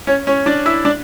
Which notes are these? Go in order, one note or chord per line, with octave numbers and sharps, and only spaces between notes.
C#4 C#5
C#4 C#5
D4 D5
E4 E5
D4 D5